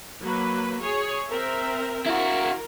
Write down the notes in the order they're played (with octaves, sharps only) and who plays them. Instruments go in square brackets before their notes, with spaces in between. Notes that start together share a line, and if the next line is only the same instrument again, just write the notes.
[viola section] F#3 A#3 B4
G#4 C#5
C4 A#4 E5
[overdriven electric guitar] E4 F#4 [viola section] A#4